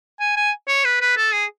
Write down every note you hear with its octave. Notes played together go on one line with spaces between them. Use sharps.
G#5
G#5
C#5
B4
B4
A4
G#4